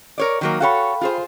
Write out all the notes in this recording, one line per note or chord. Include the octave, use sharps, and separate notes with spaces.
A#4 C#5 D5
D#3 F#3 A#3
F#4 A4 C#5 F5 G5 B5
F4 G#4 C5